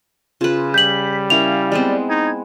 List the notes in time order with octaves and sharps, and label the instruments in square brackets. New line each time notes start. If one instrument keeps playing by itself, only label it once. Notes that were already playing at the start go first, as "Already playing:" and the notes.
[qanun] C#3 B4 [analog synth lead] F4
[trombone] G3 [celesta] G6 F#7 [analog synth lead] B6
[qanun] C#4 E4 A#4 [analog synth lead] F5 [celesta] F7
[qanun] G#3 B3 C4 [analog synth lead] D5
[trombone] D#4 [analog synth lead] G#6